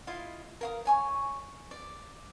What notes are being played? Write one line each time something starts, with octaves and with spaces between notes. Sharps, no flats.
E4 F4 D#5 F5
A#4 F5 D#6
C#5 G#5 C#6
D5